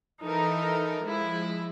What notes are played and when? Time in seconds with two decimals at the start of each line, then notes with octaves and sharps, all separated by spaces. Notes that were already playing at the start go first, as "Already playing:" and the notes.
0.22 E3 D#4 A4 A#4
1.02 F3 G#3 E4